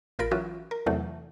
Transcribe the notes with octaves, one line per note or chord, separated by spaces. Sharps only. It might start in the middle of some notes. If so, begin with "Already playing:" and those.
A1 F4 A#4 B5 D7
E3 F#3 C#4 F4 F#4
A#4
E2 C3 E3 F#3 A3